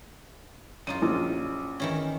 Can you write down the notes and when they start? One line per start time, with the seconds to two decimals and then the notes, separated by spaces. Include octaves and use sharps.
0.87 F#2 D#4 F4 D#7
1.02 A#1
1.80 D#3 E3 C#4